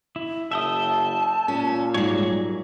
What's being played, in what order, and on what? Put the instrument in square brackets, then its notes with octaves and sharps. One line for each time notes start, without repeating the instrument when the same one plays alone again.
[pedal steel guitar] E4
[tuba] F#1 [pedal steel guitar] E5 G5 D#6 [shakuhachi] A5
[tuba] A#2 [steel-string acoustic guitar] C#4
[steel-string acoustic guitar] G#2 F#3 [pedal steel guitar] G3 G#4 C#5